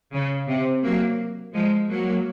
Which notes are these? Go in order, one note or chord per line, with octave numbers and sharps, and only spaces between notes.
C#3
C3
F#3 A#3
F3 G#3
F#3 A#3